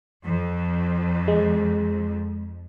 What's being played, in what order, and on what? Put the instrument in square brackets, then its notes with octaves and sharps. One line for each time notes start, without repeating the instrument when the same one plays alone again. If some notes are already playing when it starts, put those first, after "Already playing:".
[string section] F2
[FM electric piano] G#3